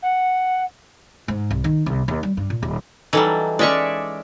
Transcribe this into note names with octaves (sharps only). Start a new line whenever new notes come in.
F#5
G#2
C2
D#3
C2
D#2
G3
G2
A#2
D#1
E3 F#3 G3 D#4 E4 A4
G#3 C#4 D5 E5 C#6